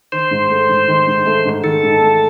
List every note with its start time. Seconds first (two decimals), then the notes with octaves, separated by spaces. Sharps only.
0.12 D#3 C5
0.31 G#2
0.50 A3
0.69 G#2
0.88 D#3
1.07 G#2
1.26 A3
1.45 G#2
1.64 D#3 A4
1.83 G#2
2.02 A3